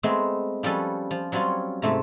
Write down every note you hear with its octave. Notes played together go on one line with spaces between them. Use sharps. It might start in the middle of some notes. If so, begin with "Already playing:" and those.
G#3 A3 B3 C4
F3 G3 C#4 A4 B4
F3
F#3 G3 C4 C#4 F4
G#2 C3 A3 A#5